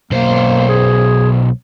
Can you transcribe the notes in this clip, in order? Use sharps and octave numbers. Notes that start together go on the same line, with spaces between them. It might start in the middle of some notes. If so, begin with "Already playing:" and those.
B1 A#3 C5
G#4